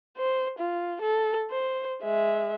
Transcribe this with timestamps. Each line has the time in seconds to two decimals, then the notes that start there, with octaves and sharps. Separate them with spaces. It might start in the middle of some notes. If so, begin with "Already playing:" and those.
0.18 C5
0.59 F4
1.02 A4
1.51 C5
2.03 G#3 E5